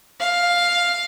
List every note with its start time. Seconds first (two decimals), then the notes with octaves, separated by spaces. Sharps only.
0.20 F5